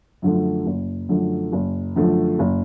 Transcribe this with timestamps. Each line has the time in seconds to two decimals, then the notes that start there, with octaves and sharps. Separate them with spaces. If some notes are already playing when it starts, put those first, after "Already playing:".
0.22 F#2 D3 F3 A3
0.66 F#1
1.09 F#2 D3 F3 A3
1.52 F#1
1.96 F#2 D3 F3 A3
2.39 F#1